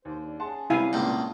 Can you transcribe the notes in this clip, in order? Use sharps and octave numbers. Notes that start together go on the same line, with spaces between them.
D#2 C5
D4
C#4 G#4 F#5 A5 C6
C3 G3 E4 F5 G#5
C#2 G2 A#2 F4